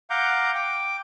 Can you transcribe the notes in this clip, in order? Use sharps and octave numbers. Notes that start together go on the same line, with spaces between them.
F5 F#5 A#5 D6 G6
G5 D6